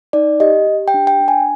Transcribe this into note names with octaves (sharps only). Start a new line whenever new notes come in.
D#4 D5
G4 D#5
G4
G5
D4
G5
D4
G#5